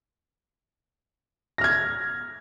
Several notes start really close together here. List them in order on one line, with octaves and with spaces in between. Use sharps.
A#6 F6 G#6